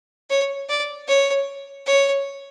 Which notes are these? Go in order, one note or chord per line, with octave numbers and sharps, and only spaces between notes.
C#5
D5
C#5
C#5